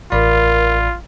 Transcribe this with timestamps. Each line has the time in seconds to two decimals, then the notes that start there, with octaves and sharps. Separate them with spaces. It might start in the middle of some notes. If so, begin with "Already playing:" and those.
0.12 A1 F4 A#4 D5 B5